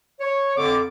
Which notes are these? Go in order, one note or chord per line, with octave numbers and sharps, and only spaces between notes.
C#5
F2 D3 D6